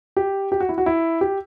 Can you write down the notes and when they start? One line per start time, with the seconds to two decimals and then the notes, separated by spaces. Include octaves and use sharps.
0.17 G4
0.52 G4
0.60 F#4
0.69 E4
0.78 F#4
0.86 E4
1.21 G4